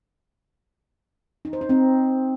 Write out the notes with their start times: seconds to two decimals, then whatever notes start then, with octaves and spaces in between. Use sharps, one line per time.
1.45 D#4
1.53 C5
1.61 D#4
1.69 C4